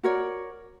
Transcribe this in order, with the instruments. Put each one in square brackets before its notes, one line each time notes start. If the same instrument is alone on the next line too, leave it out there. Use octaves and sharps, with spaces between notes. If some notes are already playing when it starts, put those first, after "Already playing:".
[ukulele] F#4 A#4 C#5 D5